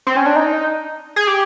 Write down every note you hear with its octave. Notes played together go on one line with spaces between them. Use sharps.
C4
C#4
D4
D#4
G#4
G4